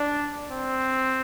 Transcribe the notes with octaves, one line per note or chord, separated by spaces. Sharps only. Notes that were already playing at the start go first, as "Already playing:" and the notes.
Already playing: D4
C4